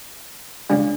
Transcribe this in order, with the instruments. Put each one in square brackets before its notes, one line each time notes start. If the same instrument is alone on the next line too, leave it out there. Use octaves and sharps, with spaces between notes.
[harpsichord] C#2 C#3 G3 [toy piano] D4